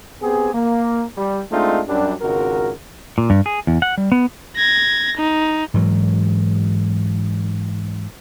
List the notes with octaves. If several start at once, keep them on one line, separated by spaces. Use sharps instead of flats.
B3 C4 G4 G#4
A#3
G3
G#3 A3 C4 D4 D#4 F4
F#2 G3 D4
G#1 C#2 G#3 F#4 A#4
A#2
G2
G#4
E2
F#5
G3
B3
G#6 A#6
D#4
G#2 E3 F#3